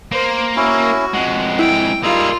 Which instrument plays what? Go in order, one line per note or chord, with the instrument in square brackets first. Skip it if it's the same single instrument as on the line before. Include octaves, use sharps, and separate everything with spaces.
[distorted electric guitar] A#3 [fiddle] C5
[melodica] C#4 E4 [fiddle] F#4
[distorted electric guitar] F2 G#3 [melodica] F#5
[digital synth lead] E4 [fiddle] G5
[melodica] G3 D#4 E6 [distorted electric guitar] A#3 G#4 [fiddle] F4